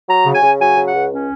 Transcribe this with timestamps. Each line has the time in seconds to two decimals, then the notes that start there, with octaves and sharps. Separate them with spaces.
0.08 F#3 A#5
0.25 C#3
0.33 G#5
0.42 C#3
0.60 F#3 G#5
0.77 C#3
0.86 F#5
0.94 C#2
1.11 C#4